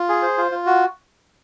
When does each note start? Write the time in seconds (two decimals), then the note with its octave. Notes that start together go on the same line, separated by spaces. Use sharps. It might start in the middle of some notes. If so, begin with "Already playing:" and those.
Already playing: F4
0.09 G#4
0.22 C5
0.38 F4
0.51 F4
0.66 F#4